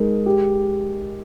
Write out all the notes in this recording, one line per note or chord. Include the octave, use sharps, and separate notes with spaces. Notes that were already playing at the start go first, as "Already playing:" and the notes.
Already playing: G#3 D#4 A#4
G4